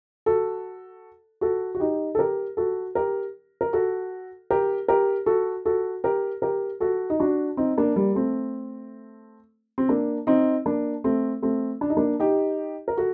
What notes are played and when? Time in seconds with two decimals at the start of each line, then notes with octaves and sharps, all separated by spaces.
0.26 F#4 A4
1.41 F#4 A4
1.75 F#4
1.80 D#4 G4
2.15 A4
2.18 G4 A#4
2.57 F#4 A4
2.95 G4 A#4
3.61 A#4
3.73 F#4 A4
4.51 G4 A#4
4.88 G4 A#4
5.26 F#4 A4
5.65 F#4 A4
6.04 G4 A#4
6.42 G4 A#4
6.80 F#4 A4
7.10 D#4
7.20 D4 F#4
7.57 C4 D#4
7.78 A#3 D4
7.96 G3 A#3
8.15 A3 C4
9.78 C4
9.89 A#3 D4
10.27 C4 D#4
10.66 A#3 D4
11.04 A3 C4
11.42 A3 C4
11.81 D4
11.90 D#4
11.97 A#3 D4
12.20 D#4 G4
12.88 A#4
12.97 F#4 A4